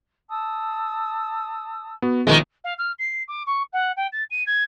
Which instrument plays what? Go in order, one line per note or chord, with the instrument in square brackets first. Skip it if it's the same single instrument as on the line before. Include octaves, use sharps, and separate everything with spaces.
[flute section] A5 D#6 E6
[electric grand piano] B3 F#4
[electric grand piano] A#1 B2 F3 [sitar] D#3 G#3
[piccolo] F5
F6
C7
D6
C#6
F#5
G5
A6
D#7
G#6